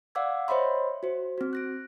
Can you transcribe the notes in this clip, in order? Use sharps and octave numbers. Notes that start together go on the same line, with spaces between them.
D5 F5 F#5 D6 E6 G#6
C5 C#5 D#5 E5 B5 C6
F#4 C5
C4 F#4
F#6 A#6 D7